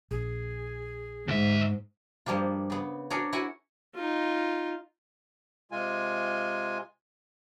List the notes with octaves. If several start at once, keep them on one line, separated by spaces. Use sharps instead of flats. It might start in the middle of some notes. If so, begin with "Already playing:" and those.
A#1 G#4
D2 G#2 E5
G2 F3 G3 A#3 F4
C#3 B3
D4 F#4 G#4 A#4 C#5
E4 F#4 E5 F#5 G#5
D#4 F4
C3 G#3 F4 G#5